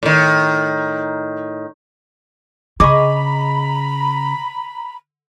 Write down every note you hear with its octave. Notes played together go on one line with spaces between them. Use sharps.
A2 D#3
C#3 G#4 D#5 A#5 B5 C#6 D6